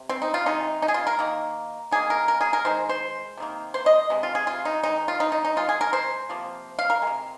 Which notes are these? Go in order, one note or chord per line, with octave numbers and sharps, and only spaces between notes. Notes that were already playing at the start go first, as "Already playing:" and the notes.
Already playing: C3
C4
D#4
F4
C3 D#3 G#3 D#4
D#4
G#4
F4
A#4
D#3 A#3
D#3 A#3 G#4
A#4
A#4
G#4
A#4
D#3 G#3 C5
C5
C3 D#3 A#3
C5
D#5
C3 G#3
F4
G#4
F4
D#4
D#3 G#3 D#4
F4
D#4
D#4
D#4
D#3 G#3 F4
G#4
A#4
C5
C3 F3 A#3
F5
A#4
G#3
C3